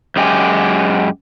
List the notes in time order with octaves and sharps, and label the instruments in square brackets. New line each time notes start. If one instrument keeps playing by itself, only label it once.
[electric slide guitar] F#2 G#3 G4 G#5